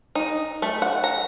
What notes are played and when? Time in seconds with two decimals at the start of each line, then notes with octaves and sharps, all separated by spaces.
0.15 D#4
0.62 A3
0.82 F#5
1.04 A#5